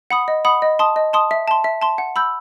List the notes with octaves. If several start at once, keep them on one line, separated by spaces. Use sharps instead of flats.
F#5 B5 D#6
D#5
F#5 B5 D#6
D#5
A5 C6 D#6
D#5
A5 C6 D#6
E5
A5 C6
E5
A5 C6
F#5
B5 E6 G6